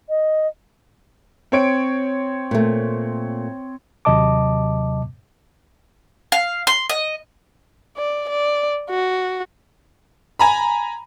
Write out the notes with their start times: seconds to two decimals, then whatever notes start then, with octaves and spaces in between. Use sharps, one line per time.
0.09 D#5
1.52 C4 C#5 D7
2.51 A#2 A3
4.05 D#2 C3 F#3 D#5 A5 D6
6.32 F5
6.67 C6
6.90 D#5
7.97 D5
8.29 D5
8.90 F#4
10.39 G#5 A#5 B5